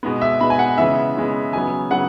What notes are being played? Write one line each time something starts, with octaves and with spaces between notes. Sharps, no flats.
B2 G#3 B3
E5
B2 G#3 B3 B5
G#5
F#5
C#3 E3 G#3 B3 E5
C#3 E3 G#3 B3
C#3 F#3 B3 G#5
C#3 F#3 B3 F#5